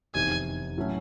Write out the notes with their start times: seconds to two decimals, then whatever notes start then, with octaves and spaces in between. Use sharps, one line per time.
0.14 F1 E2 C3 D#3 G#5
0.77 A2 F#3 A3 C#4